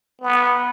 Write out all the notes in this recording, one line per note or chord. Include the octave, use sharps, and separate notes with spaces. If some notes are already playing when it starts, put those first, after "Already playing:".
B3